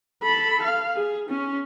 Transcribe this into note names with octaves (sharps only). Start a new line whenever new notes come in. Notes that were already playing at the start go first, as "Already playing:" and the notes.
A4 B5
F5
G#4
C#4